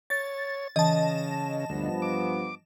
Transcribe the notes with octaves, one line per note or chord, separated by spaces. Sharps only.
C#5 A6
C#3 E3 D#5 A5
D2 G2 F3 B3
D6